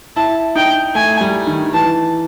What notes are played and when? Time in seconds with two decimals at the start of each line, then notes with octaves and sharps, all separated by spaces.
0.16 E4 A5
0.56 D#4 G5
0.95 A3 G#5
1.21 G3
1.47 D#3
1.74 E3 A5